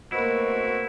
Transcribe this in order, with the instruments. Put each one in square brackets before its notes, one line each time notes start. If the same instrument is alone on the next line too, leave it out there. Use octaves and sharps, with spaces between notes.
[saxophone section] B2 C4 F#4 [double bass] A3 A#3 [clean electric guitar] E4 [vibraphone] D#5 B5